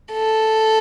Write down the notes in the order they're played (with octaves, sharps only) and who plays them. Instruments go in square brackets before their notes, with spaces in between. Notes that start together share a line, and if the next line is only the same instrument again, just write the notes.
[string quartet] A4